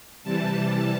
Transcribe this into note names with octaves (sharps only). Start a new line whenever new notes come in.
C3 E3 G3 A5
A5